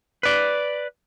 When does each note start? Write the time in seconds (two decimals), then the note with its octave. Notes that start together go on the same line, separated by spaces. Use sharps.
0.23 B4 D5